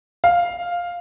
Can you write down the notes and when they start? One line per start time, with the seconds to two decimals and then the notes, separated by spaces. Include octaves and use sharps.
0.24 F5